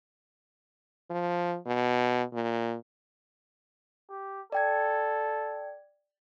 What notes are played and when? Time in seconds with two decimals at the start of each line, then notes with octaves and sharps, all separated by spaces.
1.10 F3
1.66 B2
2.33 A#2
4.09 G4
4.52 A4 D5 G5 G#6